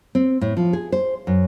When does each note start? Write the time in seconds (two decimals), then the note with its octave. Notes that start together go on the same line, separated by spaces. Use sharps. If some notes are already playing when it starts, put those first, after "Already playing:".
0.15 C4
0.41 A2
0.57 F3
0.73 G#4
0.92 C5
1.27 F#2